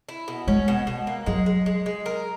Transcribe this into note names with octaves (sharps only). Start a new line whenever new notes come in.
E4
B2
G#3 C#4
B2
B2
A#3
F#3 G#3
G#3
G#3
G#3
A#4